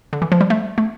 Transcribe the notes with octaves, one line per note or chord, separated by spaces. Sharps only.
D3
E3
F3
G3
A3
A3